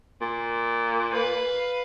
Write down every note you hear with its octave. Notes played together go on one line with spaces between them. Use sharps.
A#2
B4 F5